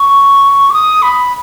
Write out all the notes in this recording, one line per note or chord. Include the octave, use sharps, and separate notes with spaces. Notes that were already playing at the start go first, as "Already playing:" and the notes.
Already playing: C#6
D6
D#6
B5